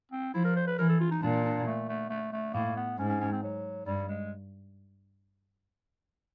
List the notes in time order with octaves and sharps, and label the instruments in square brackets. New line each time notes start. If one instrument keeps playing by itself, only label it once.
[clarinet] C4
[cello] F3 [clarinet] E4
[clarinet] A#4
C5
B4
[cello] E3 [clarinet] A#4
[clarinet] A4
F4
D#4
[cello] A#2 [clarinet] D4
[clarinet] D4
A3
A3
A3
A3
[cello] A2 [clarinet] A#3
[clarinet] B3
[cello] G#2 [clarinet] C#4
[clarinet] C#4
C#4
C4
F#3
[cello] G2 [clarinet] G3
[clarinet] G#3